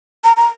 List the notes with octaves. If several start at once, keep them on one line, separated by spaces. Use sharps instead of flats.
A#5
A#5